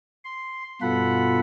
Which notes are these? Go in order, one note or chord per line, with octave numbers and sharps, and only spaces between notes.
C6
G2 B2 F4 A4 F#5 B5